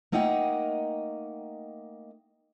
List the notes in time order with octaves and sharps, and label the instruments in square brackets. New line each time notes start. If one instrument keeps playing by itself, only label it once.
[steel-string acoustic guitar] A3 A#3 D#4 D#5 F#5 G5